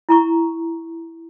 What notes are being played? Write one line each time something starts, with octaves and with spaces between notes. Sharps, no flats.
E4 A#5 C#6